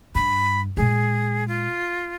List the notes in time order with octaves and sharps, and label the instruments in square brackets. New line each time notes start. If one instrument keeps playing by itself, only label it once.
[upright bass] G2 [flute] B5
[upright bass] A#2 G#3 [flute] G#4
[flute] F4